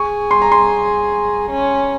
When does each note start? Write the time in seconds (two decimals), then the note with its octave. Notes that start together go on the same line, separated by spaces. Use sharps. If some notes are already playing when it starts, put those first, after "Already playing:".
Already playing: G#4 C#6
0.31 C6
0.42 A#5
0.52 C6
1.50 C#4